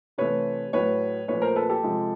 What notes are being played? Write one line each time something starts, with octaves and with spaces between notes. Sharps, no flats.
C3 E3 A3 B4 C#5
A2 F#3 A3 B4 C#5
A#2 F3 A3 B4 C#5
A#4 C5
A4 B4
G4 A4
C3 F3 G#3